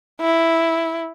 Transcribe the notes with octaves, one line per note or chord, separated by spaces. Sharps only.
E4